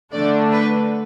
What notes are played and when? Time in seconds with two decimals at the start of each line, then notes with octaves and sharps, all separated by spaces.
0.13 D3 A3 D4 D5
0.52 B4